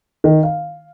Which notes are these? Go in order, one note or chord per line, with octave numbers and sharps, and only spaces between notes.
D#3
F5